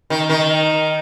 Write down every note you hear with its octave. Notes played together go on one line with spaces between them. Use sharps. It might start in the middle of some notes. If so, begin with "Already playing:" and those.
D#3
D#3